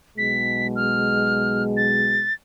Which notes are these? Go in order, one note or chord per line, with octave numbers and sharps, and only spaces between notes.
B1 B2 G#3 B6
F6
A6